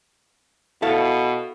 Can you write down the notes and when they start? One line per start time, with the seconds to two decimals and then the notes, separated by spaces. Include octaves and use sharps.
0.82 B2 E4 A4 F5